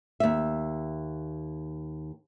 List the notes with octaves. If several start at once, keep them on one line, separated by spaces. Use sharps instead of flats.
D#2 E5